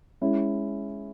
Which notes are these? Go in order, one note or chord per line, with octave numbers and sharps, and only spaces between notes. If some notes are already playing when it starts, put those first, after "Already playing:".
G#3 C#4 E4